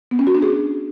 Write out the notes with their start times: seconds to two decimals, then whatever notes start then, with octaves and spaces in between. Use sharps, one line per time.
0.11 B3
0.19 C#4
0.27 F#4
0.35 D4
0.42 G#4